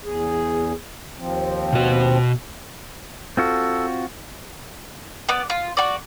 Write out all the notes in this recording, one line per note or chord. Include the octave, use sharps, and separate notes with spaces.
E2 G#4
D#2 F3 C4
B2 F#4
C4 F4 F#4 A4
B3 D5
F4
F#4 D5